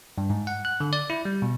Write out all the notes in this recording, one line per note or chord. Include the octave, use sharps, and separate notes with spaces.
G2
G#2
F#5
F#6
D3
D5
E4
G3
B2